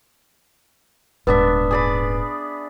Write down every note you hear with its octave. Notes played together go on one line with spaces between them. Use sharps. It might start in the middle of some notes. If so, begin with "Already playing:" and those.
D#1 G#2 B3 D4 B4 E5
G#4 D5 B5